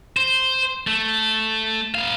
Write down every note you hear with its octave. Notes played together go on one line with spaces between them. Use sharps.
C5
A3
B3 F5